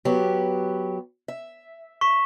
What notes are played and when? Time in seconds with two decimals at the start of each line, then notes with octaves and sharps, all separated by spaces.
0.05 F#3 B3 G4
1.28 E5
2.01 C#6 B6 E7